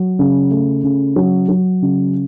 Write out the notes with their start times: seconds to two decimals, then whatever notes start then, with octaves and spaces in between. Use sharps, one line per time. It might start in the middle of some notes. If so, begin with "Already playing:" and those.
Already playing: F#3
0.19 C#3
0.51 A3
0.84 C#3
1.16 F#3
1.49 F#3
1.82 C#3